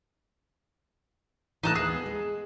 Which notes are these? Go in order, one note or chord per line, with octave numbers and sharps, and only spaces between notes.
E3 G3 A3 D#4 A5 F#6
D#2 G#4
B3
G#3